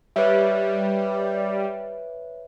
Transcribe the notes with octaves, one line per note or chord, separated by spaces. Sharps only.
G3 B4 C#5 E5